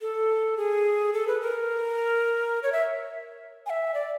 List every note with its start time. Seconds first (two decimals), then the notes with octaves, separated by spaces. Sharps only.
0.01 A4
0.57 G#4
1.13 A4
1.27 B4
1.41 A#4
2.63 C#5
2.72 E5
3.66 G#5
3.70 E5
3.94 D5